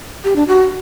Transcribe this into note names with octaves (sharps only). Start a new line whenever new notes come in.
G4
D4
F#4